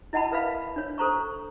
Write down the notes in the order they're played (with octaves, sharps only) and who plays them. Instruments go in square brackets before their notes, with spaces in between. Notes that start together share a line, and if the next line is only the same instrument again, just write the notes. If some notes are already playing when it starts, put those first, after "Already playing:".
[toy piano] E4 D#5 F#5 A5 B5
A#4 B4 E5 F5 B5
D4 C#5
A4 C5 A#5 C#6